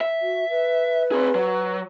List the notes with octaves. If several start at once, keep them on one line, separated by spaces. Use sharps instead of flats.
E5
F#4
B4
C4 G#4
F#3